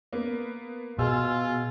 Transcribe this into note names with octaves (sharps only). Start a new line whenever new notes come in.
A#3 B3
B2 F4 G#4 G#5 E6